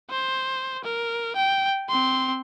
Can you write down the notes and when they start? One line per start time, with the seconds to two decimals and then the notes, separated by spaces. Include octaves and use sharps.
0.10 C5
0.84 A#4
1.36 G5
1.89 C4 C6